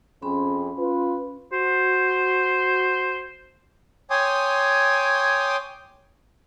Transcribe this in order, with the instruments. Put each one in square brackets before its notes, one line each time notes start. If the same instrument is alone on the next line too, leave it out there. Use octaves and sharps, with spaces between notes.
[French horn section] F2 C4 G#4 [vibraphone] C#4 B5 C6
[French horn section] F4 B4
[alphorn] F#4 [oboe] C5
[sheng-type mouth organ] C#5 G5 G#5 C6 D6 D#6